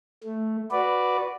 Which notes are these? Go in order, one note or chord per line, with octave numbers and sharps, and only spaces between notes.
A3
F#4 B4 D5